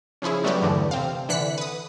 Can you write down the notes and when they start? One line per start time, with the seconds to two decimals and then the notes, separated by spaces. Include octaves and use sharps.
0.22 C#3 F3 C#4 E4 G#4
0.44 F#3 G3 A3 B3 F#4 G4
0.61 E2 G2 D3 E3 A3
0.91 C3 C4 F5
1.29 D3 E3 F#6 B6 C#7
1.58 B4 D#6